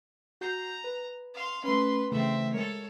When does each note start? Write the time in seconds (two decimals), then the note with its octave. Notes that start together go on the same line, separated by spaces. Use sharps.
0.41 F#4 A#5 G6 C7
0.84 B4
1.34 F5 C6
1.64 A3 C#4 B4 C6
2.12 C#3 E3 A3 C4 E5
2.53 G#3 A4 A#4 C#5